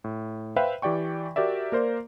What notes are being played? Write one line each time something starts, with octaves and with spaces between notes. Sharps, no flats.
A2
B4 C5 E5 F5 G5
E3 G4 D5 G5 C#6
F#4 G4 A#4 D5 E5
A#3 A#4 C5 D5